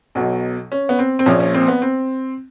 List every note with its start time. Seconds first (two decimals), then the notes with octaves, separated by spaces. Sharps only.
0.15 B1 B2 F#3
0.72 C#4
0.89 B3
0.99 C4
1.19 C4
1.26 A#1 A#2 F3 C#4
1.40 C#4
1.54 C4
1.68 B3
1.82 C4